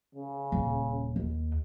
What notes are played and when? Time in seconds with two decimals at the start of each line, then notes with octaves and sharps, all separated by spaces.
0.15 C#3
0.52 D#1
1.16 D#2